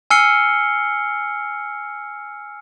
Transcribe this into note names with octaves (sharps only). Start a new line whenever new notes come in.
G#5 E6 F6 C7 C#7 G7